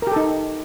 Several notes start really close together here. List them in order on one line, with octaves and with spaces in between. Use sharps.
A#4 G4 A4 D#4